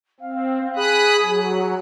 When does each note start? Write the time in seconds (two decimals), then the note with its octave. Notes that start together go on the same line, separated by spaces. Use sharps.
0.20 C4 F5
0.76 G#4 B5 D#6 F#6
1.22 F#3